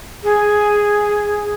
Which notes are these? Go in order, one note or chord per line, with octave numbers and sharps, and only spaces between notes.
G#4